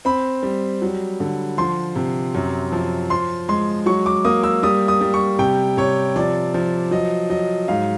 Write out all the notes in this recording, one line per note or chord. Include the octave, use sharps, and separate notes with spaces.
C4 B5
G3
F#3
D3
F3 C6
C3
F#2
F3
F3 C6
G#3 C6
F#3 C#6
D6
A#3 D#6
E6
G3 D#6
D#6
G3
C#6
C3 G5
C3 C#5
F3 D5
F3
F#3 D#5
F#3 D#5
G#2 F5